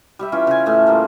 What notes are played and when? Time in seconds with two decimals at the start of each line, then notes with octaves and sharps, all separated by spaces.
0.19 G3 G4 E5
0.32 E3 C#4 F4
0.47 C#3 G#5
0.66 A2 A3 A5
0.87 G3 A#3 F4 A#5